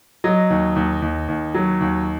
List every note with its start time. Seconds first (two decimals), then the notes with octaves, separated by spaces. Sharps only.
0.24 F#3 D#5
0.50 D#2
0.76 D#2
1.02 D#2
1.28 D#2
1.54 F#3
1.81 D#2